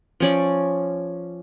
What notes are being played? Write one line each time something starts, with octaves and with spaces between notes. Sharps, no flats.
F3 C#4 D5